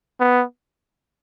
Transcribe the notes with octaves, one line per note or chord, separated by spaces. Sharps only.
B3